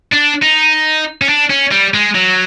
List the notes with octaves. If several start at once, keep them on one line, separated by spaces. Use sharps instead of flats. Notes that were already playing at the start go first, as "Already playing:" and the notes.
D4
D#4
C#4
D4
C#4
G3
G#3
F#3